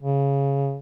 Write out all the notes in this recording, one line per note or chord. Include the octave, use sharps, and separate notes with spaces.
C#3